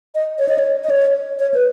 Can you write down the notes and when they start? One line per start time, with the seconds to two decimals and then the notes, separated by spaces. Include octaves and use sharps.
0.15 D#5
0.39 C#5
0.49 D#5
0.58 C#5
0.84 D#5
0.90 C#5
1.39 C#5
1.54 B4